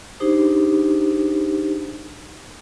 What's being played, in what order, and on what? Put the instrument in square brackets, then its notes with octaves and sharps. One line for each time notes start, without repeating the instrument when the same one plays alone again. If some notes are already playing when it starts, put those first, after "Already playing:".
[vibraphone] D4 D#4 G4 G#4 C5